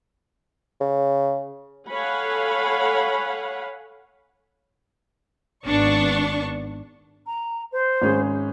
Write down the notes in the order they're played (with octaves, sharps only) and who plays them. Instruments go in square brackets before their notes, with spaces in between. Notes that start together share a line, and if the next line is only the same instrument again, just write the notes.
[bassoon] C#3
[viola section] A4 C#5 F5 F#5 G#5 B5
[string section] G#1 B3 D4 D5 C#6
[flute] A#5
C5
[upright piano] G#1 C#4 G#4